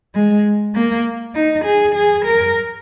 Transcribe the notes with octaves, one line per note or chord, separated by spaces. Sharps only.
G#3
A#3
D#4
G#4
G#4
A#4